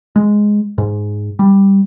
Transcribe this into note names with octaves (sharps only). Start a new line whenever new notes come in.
G#3
G#2
G3